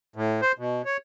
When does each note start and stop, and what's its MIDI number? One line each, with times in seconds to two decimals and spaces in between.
0.16 0.41 45
0.42 0.52 72
0.59 0.82 47
0.85 0.97 73